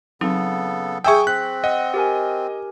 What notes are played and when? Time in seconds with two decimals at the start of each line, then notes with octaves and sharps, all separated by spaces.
0.21 C#3 F#3 B3 C4 D#4 A4
1.04 G#4 E5 G5 G#5 C#6 D#6 E6 G6
1.27 C4 F#6 B6
1.64 D#5 F#5
1.94 G4 A#4 G#5